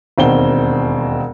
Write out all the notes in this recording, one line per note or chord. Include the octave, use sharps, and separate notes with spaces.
E1 D#2 C4 D#4 F#5 G7